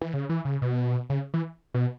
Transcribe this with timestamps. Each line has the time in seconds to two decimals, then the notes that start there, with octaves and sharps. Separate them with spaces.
0.01 E3
0.14 C#3
0.29 E3
0.45 C#3
0.62 B2
1.10 C#3
1.34 E3
1.74 B2